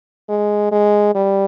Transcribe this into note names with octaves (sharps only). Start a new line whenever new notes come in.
G#3
G#3
G3